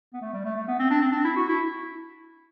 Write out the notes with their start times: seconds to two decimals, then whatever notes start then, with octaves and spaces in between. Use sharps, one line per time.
0.14 B3
0.22 A3
0.33 G3
0.45 A3
0.56 A3
0.68 B3
0.79 C4
0.90 D4
1.01 C4
1.12 D4
1.25 E4
1.36 F#4
1.48 E4